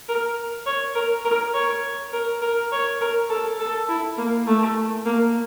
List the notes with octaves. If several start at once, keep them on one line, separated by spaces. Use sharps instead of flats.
A#4
C#5
A#4
A#4
C#5
A#4
A#4
C#5
A#4
A4
A4
E4
A#3
A3
A#3